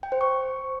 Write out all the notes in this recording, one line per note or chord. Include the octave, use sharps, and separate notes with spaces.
G5
C5
C#6